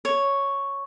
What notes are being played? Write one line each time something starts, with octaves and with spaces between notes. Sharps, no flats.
C#5